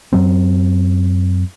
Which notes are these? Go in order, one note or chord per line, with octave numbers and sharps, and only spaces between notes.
F#2 F#3 C4